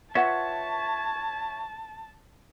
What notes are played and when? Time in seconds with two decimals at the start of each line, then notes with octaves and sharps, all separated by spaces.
0.15 F4 B4 C#5 E5 F#5 A5